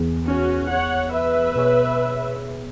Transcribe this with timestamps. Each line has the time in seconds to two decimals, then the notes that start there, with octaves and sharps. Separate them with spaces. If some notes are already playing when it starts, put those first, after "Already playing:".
Already playing: E2 E3 B3 G#4
0.25 C#4 F#4
0.68 C#5 F#5
1.12 B4 E5
1.56 B2 B3 G#4 C#5